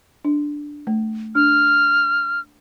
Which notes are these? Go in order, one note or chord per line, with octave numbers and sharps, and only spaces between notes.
D4
A3
D4 F6